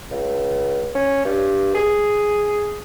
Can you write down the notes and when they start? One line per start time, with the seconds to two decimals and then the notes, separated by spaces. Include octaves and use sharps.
0.11 C#2
0.95 C#4
1.25 G2
1.75 G#4